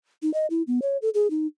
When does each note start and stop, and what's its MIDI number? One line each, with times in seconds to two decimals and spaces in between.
0.22 0.32 63
0.34 0.46 75
0.50 0.62 64
0.67 0.80 59
0.82 0.97 73
1.02 1.09 69
1.14 1.30 68
1.30 1.47 63